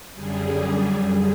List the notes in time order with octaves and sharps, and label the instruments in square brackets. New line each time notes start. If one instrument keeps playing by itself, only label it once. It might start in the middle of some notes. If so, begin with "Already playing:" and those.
[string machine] F#2 D3 G3 G#4